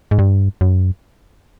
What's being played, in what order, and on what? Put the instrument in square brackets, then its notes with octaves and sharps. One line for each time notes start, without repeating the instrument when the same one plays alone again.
[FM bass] G#2
G2
F#2